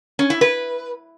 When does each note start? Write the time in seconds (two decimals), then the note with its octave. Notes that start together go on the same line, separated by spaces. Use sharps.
0.19 C#4
0.30 E4
0.41 B4